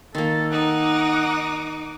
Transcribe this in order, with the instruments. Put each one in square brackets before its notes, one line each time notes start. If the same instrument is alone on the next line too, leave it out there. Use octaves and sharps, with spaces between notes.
[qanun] D#3 A#3 [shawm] A4
[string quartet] D#4 D6 [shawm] F#5